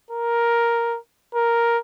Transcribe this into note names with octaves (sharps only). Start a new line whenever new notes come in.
A#4
A#4